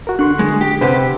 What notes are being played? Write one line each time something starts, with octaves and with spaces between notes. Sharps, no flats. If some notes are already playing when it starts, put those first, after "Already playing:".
F#4 A#4
D3 C6 C#6 F#6
G#3
G4
C3 G4 B4 C5 F#5